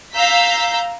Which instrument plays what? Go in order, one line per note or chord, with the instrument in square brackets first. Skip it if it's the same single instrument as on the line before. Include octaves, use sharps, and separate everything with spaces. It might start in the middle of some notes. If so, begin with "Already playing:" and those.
[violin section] F5 A#5 E6 G6 B6